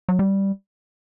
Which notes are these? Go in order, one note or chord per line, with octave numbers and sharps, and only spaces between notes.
F#3
G3